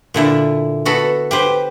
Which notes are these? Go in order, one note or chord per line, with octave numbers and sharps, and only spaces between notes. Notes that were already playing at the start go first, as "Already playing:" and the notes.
A#2 D3 E4 E5
B3 F#4 A4 B5
G4 B4 C5